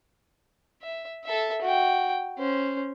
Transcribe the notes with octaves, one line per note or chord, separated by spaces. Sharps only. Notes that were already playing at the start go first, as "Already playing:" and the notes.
E5
A4 E5
F#4 G5
C#4 C5